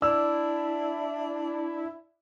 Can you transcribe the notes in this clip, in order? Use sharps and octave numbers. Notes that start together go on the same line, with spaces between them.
D4 E4 D5 E6